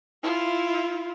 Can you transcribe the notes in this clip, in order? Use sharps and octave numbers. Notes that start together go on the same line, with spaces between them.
E4 F4